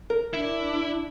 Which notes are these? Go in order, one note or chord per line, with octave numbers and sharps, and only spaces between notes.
A#4
D4 E4